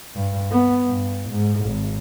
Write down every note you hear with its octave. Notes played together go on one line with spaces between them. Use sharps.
G2
B3
G2
G#2
G#1